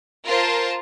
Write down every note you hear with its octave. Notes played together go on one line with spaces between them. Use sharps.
F4 A#4 C5 A5